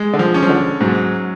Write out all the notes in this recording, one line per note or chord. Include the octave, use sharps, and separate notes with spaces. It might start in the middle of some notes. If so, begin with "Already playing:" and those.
Already playing: G#3
D3
F3
C#4
F3
D3
G#2 F#3